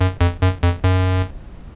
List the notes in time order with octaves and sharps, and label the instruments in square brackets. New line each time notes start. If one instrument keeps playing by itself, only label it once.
[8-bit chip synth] F#2
F2
F#2
F2
F#2